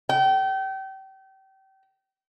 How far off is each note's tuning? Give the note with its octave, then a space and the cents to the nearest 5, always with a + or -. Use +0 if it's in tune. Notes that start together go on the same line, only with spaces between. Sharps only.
G5 -30